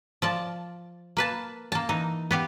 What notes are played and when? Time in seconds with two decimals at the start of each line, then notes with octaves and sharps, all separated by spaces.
0.22 F3 D5 A5
1.17 A#3 B4 A5
1.72 A#3 A5
1.89 E3 D#4
2.31 B3 G4 F5